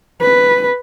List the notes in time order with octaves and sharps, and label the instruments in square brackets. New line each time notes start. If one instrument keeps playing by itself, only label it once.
[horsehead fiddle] B4